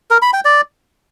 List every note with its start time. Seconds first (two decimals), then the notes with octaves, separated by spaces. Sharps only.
0.11 A#4
0.22 B5
0.33 G5
0.45 D5